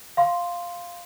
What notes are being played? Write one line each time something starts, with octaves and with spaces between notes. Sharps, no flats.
F5 C6